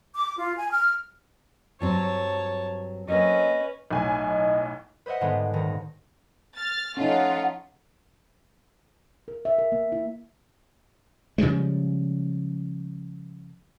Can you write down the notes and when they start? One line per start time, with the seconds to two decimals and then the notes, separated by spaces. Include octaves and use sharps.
0.14 D6
0.36 F4
0.56 G#5
0.71 F6
1.81 G2 F#3 C4 C#5 A5
3.08 F#3 A#3 C4 C#4 B4 D#5
3.91 B1 A2 G#5
4.23 D#5
5.06 B4 C5 D#5 E5 F#5
5.21 G#2 D3 D#3 G3 G#3 B3
5.53 D#1 D#3 A#6
6.55 F6 A6
6.97 F3 A3 C#4 D#4 F4 F#5
9.28 A#4
9.45 E5
9.59 A#4
9.72 A#3
9.92 E4
11.38 C#3 F3 G3 G#3